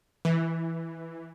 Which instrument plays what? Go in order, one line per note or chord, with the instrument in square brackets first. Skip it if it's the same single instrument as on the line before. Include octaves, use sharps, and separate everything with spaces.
[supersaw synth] E3